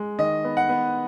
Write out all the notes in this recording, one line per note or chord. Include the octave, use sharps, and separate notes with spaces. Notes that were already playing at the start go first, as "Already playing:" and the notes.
Already playing: G#3
D#3 D#5
B3
F#5
B3